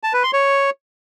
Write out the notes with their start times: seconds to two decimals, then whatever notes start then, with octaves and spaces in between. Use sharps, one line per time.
0.03 A5
0.13 B4
0.23 C6
0.33 C#5